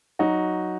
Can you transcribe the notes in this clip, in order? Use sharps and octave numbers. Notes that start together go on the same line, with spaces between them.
F#3 D#4 F#4